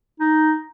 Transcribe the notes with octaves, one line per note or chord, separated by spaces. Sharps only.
D#4